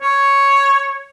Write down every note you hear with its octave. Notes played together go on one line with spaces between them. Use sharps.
C#5